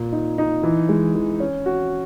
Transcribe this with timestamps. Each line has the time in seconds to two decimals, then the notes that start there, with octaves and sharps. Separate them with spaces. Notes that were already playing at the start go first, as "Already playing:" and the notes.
Already playing: A#2
0.12 D#4
0.38 D#4
0.63 E3
0.89 G#3
1.15 E3
1.40 C#4
1.66 F#4